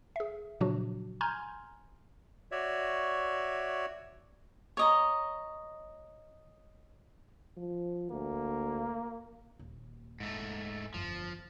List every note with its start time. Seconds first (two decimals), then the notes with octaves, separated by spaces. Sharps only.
0.16 G#4 E5
0.61 A#2 C#3 F3 F#3 D4 F#4
1.21 G#5 A#5 C6 F6 G6 G#6
2.51 F#4 C#5 D5 E5
4.77 C#5 D#5 A#5
7.57 F3
8.11 D2 A#3
9.59 D#1 D#2
10.20 G#2 A3
10.94 G1 F2 F3